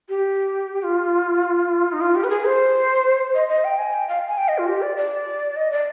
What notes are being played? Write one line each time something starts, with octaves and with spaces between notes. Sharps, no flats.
G4
F4
D#4
F4
G4
B4
G#4
C5
D#5
D#5
G5
G#5
G5
F5
G#5
G5
D#5
F4
G4
D5
D5
D#5
D5